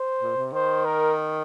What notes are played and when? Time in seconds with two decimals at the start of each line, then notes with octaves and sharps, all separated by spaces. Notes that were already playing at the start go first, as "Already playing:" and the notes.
Already playing: C5
0.21 A#2
0.37 C3
0.53 D#3 C5
0.85 A#4